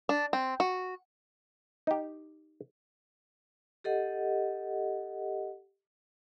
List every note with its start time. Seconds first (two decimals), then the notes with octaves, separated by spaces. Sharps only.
0.09 D4
0.33 C4
0.60 F#4
1.87 D#4 G4
3.84 G4 A4 D#5 F#5